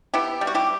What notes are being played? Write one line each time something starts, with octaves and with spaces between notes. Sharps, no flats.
B3 E4 G4
G3
F#4
E4 G4